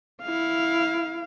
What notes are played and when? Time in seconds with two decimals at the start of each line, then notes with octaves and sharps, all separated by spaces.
0.22 E4 F5